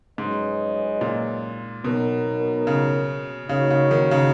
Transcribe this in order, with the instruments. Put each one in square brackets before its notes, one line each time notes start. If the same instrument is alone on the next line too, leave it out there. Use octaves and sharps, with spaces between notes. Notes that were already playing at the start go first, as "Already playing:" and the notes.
[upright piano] G#2 [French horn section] F#3 C#4 G#4 B4 D#5
[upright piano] A#2
[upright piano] B2 [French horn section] F#3 B3 D#4 A#4
[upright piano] C#3
[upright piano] C#3 [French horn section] A#3 D#4 F#4 C#5
[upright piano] C#3
D#3
C#3